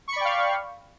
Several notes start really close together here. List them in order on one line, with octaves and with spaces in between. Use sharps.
C#6 B5 D5 G5 F5